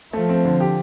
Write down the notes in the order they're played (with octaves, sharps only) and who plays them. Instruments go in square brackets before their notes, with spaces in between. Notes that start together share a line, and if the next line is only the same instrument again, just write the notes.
[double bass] F3 [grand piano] A3
[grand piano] C4
D3
G4